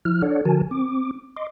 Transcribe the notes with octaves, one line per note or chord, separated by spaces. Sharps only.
F3 E4 F6
D4 A4 C#5 D5 F#5
D3 F3 F#4 A#4 G#5 A5
C4 D6
D#5 C6 D6